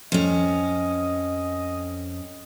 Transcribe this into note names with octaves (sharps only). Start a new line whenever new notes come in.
F2 C#4 D#5